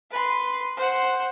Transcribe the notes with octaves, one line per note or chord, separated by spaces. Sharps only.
B4 C6
C5 F#5